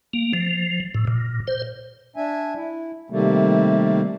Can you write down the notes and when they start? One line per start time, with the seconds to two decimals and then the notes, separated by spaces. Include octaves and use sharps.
0.13 A#3
0.33 F3
0.95 A2
1.07 A#2
1.47 C5
2.16 D4 E5 G#5
2.56 E4
3.10 C3 D#3 G3 A3 A#3